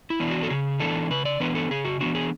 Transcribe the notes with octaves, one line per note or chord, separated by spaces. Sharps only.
E4
E3 B3 D4
F#4
A4
C#3 G#4
E3 B3 D4 A4
C#3 B4
D5
E3 B3 D4 B4
A4
C#3 G#4
F#4
E3 B3 D4 F#4
G#4